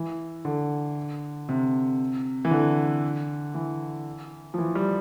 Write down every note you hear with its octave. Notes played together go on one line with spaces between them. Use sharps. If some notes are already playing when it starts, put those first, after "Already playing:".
Already playing: E3
D3
C3
E3
D3
E3
F3
E3
G3